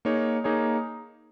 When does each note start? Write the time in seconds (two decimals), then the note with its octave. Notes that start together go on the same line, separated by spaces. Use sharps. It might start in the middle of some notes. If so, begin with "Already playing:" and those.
0.05 A#3 D#4 G#4 C#5
0.44 A#3 D#4 G#4 C#5